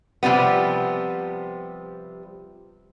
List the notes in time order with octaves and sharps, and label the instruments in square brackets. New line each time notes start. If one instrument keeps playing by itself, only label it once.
[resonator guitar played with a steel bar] C3 F3 G3 B3